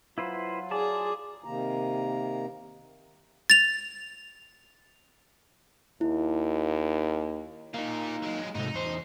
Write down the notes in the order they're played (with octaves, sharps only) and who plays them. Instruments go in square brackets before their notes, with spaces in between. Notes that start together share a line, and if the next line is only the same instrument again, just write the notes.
[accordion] F#3 F4 [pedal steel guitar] E4 B4 C5
[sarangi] G#4 [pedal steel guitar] D5 A5
[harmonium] C3 D#3 A#3 A#5
[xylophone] A6 F7
[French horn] D#2 [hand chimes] E4
[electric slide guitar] A#3 D#4 [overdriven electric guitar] F4 A#4
[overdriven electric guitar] F#3 G#3
[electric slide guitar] G#2 C3 A3 [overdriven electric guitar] D#4
[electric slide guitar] E2 C5